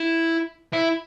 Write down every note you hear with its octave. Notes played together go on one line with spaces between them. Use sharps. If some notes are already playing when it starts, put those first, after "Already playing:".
Already playing: E4
E4